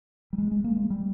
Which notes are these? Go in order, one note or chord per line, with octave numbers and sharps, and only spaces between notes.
G3
G#3
G#3
A#3
G#3
G3